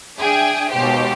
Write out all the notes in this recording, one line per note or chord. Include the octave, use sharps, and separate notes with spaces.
D4 G#4 E5 G5 G#5
D#2 B2 G#3 G4 C5